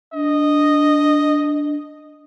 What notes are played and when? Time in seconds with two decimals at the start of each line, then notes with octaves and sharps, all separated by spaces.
0.13 D4 D#5